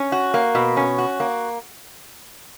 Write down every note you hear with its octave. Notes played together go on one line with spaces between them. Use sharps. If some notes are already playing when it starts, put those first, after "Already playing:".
Already playing: C#4
F#4
A#3
B2
C#4
F#4
A#3